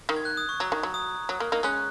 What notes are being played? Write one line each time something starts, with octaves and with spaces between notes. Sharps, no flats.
D#3
G#6
F#6
D#6
C#6
F#3 A#5
D#3
F#3
D#6
F#3
A#3
A#3 D#4
G#3 C#4 F#6